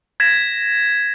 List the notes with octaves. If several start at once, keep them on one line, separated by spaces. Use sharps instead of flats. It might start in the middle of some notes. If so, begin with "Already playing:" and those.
G#6 A#6 B6 E7